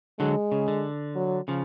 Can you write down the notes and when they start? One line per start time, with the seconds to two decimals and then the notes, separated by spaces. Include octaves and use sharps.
0.19 D3 F#3 G#3
0.52 C#3
0.68 D3
1.16 F#3
1.48 C#3 F3